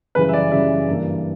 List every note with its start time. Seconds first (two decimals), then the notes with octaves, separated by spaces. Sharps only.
0.15 F#2 C#3 E3 G3 B4
0.29 E5
0.33 D5
0.52 F#2 C#3 E3 G3 E5
0.88 G2 E3 A#3